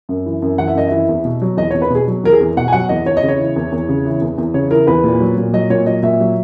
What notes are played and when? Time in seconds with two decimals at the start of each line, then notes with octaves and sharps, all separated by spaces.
0.09 F#2
0.26 E3
0.42 F#2
0.58 E3 F#5
0.68 E5
0.75 F#2 D#5
0.87 E3 E5
1.09 E2
1.25 B2
1.42 F#3
1.57 E2 D#5
1.71 E2 C#5
1.82 B4
1.90 B2 G#4
2.08 F#3
2.23 E2 A#4
2.32 G#4
2.40 E2
2.57 B2 F#5
2.68 G#5
2.72 F#3 F#5
2.89 E2 D#5
3.06 E2 C#5
3.17 D#5
3.23 C#3
3.28 C#5
3.39 E3
3.56 E2
3.72 E2
3.89 C#3
4.06 E3
4.21 E2
4.38 E2
4.54 C#3 C#5
4.71 E3 A#4
4.87 E2 B4
5.04 A#2
5.20 F#3
5.38 A#2
5.53 F#3 D#5
5.70 A#2 C#5
5.86 F#3 D#5
6.03 A#2 E5
6.20 F#3